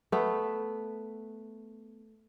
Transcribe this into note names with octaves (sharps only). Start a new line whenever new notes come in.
A3 B3